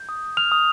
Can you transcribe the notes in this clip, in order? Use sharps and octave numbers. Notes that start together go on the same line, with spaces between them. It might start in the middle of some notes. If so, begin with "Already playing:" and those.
Already playing: G6
D#6
F6 F7
D#6